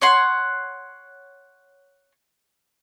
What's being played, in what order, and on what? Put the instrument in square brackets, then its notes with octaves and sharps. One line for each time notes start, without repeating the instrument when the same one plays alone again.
[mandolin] C#5 F#5 C6